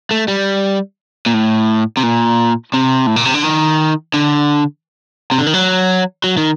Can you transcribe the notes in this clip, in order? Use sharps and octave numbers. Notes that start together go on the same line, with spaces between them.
A3
G3
A#2
A2
C3
A#2
C3
A2
A#2
C3
D3
D#3
D3
C3
D3
D#3
F#3
F#3
D#3